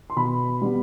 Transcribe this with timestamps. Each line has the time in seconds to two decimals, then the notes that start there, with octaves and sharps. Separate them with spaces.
0.10 C6
0.16 B2 B5
0.62 G3 B3